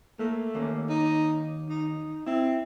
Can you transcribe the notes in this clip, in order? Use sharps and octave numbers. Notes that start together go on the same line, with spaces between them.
A3 A#3
D#2 A#3 C#4
D#4
D#4
C4 E4